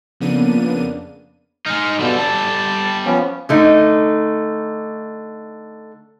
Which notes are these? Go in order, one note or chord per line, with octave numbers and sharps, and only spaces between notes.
F2 C#3 A#3 B3 D4 D#7
G#3 D#4 F6
G2 B2 D3 G3 A4
A5
F3 B3 C#4
D3 A3 D#4